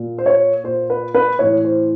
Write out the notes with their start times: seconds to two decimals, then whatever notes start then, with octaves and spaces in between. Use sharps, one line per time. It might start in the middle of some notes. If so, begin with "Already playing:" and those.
Already playing: A#2
0.18 C5
0.26 C#5
0.64 A#2 C5
0.90 B4
1.15 B4
1.39 A2 E3 C#5
1.65 C5